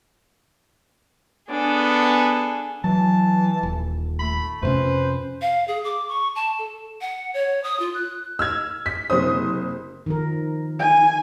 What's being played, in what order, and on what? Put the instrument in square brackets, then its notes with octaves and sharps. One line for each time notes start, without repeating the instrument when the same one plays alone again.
[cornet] B3 [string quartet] D4 G#4 A4
[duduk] E3 [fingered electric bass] F#3 [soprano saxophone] A5
[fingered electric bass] D#1
[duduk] A3 [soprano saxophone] B5
[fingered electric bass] F2 C3 C#4 [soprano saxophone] B4 [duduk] C5
[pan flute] F5
G#4
D6
C#6
A5
A4
F#5
C#5
D#6
F4
F#6
[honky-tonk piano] E6 F6 G#6
B6
F#1 C3 C5 D#6
[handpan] D#3 F3 A#4
[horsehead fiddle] G#5